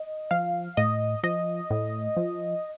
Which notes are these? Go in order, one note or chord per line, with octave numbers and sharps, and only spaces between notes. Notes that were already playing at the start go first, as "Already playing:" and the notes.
Already playing: D#5
F3 F5
A2 D#5
F3 D#5
A2
F3